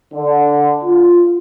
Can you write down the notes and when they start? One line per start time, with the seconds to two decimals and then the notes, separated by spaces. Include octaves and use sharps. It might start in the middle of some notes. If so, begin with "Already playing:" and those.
0.13 D3
0.84 F4